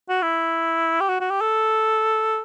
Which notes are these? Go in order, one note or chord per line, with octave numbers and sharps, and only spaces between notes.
F#4
E4
G4
F#4
F#4
G4
A4